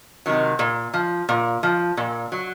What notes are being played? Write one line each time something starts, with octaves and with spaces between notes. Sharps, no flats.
C3 D#3 F#3
A#2
F3
A#2
F3
A#2
F#3